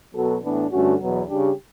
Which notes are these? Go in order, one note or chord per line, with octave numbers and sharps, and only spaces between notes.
B2 F#3 B3 F#4 A4
A2 E3 B3 D4
G2 D3 A3 C#4 F#4
E2 B2 F#3 B3
C#3 G3 D4 G4